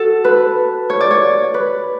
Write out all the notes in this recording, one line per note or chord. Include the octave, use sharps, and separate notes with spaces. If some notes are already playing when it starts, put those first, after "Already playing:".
Already playing: F#4 A4
B4
C#5
D5
C#5
B4